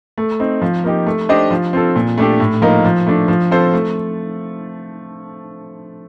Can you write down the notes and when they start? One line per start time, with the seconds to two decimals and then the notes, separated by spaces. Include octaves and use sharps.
0.18 A3
0.40 C4 D#4
0.62 F3
0.84 A#3 D#4 G4
1.07 A3
1.29 D4 G4 C5 D#5
1.51 F3
1.73 C4 F4 A4
1.96 A#2
2.18 A3 D4 G4
2.40 A2
2.62 F3 A#3 D#4 A#4
2.85 F3
3.06 A3 D4
3.28 F3
3.51 C4 F4 A4 C5
3.73 A3